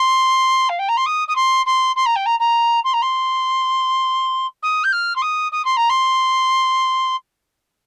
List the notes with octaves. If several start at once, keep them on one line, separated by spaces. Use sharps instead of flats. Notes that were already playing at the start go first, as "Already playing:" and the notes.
Already playing: C6
F5
G5
A#5
C6
D#6
D#6
C6
C6
C6
A#5
G5
A#5
A#5
C6
A#5
C6
D#6
G6
F6
C6
D#6
D#6
C6
A#5
C6